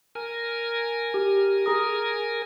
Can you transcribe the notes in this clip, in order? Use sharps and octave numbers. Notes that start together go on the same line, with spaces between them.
A#4 G#5
G4
G#4 A#5 D#6